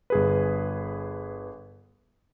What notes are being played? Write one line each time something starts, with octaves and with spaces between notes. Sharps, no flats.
G1 G#4 B4